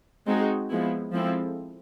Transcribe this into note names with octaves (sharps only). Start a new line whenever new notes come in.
G#3 C4 D#4 F#4
F3 G#3 B3 E4
F3 G#3 C4 E4 A4